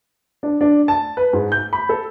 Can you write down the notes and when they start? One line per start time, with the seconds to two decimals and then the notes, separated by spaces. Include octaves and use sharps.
0.43 D4
0.61 D4
0.88 A5
1.17 B4
1.33 G#2
1.52 G6
1.73 B5
1.89 A4